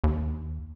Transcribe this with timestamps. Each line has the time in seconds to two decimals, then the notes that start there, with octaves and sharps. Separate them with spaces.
0.04 D#2